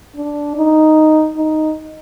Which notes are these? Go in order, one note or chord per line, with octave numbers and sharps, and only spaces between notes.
D4
D#4
D#4